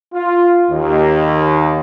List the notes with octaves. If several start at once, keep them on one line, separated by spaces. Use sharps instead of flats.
F4
D#2